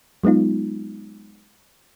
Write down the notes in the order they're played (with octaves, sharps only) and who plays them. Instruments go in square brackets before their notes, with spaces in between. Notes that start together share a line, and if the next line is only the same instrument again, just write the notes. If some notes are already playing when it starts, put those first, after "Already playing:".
[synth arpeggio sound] F#3 G#3 B3 D#4 F4